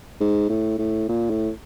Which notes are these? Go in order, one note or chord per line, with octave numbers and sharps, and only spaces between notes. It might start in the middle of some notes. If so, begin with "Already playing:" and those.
G#2
A2
A2
A#2
A2